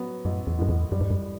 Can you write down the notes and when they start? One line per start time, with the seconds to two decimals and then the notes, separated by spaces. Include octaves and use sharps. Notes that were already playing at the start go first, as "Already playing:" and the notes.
Already playing: F#3 B3
0.25 A1 F#2
0.47 E2
0.58 F#2 A2
0.69 E2
0.92 F#2 G3
1.01 G2
1.11 F#2